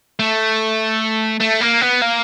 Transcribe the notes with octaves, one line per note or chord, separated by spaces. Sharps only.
A3
A3
A#3
B3
A#3